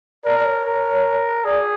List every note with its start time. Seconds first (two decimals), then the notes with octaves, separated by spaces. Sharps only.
0.24 A#4 D5
0.39 D5
0.45 C#5
0.65 A#4
1.45 G#4 D5